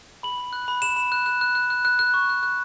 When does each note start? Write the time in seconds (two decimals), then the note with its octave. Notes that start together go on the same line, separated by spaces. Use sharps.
0.23 B5 F#7
0.38 B5
0.53 F#6
0.68 B5
0.82 B5 E7
0.96 B5
1.12 F#6
1.26 F#6
1.41 F#6
1.55 F#6
1.70 F#6
1.85 F#6
1.99 F#6
2.14 C#6
2.29 F#6
2.43 F#6